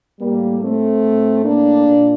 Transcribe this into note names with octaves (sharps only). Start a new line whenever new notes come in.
A2 G3 A#3
A3 C4
A2
A#3 D4
A#2